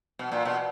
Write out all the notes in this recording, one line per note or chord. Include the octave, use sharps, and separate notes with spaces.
B2
A#2
B2